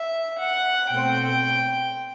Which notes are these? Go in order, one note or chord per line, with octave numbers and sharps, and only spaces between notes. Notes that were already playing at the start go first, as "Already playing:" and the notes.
Already playing: E5
F#5
B2 A3 C4 G5